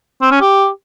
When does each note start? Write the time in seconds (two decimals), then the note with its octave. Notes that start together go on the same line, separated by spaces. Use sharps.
0.21 C4
0.31 C#4
0.41 G4